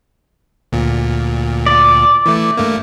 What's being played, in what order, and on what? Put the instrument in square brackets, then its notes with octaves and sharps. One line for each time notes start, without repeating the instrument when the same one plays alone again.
[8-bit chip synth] D2 A#2
[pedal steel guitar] D5
[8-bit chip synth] E3 A3
G2 A3 A#3